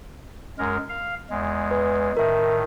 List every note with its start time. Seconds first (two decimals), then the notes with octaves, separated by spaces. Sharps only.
0.59 F#2 G#3 A#4
0.89 F5
1.30 E2 G#3
1.71 B4
2.17 A2 D#3 A#4 E5